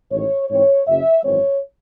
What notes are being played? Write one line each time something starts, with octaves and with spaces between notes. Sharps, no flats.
A1 G#2 D#3 C#5
G#2 E3 C4 C#5
F#1 F#2 C#3 E5
G#1 F#2 E3 G#3 C4 C#5